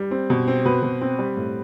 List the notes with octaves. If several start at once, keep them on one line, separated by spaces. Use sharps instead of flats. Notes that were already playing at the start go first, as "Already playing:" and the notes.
Already playing: G3
C4
B2
C4
B2 B4
B2
C4
G3
A2